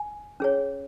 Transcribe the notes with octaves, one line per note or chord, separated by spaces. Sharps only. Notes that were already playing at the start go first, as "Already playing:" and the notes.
Already playing: G#5
C#4 G#4 C#5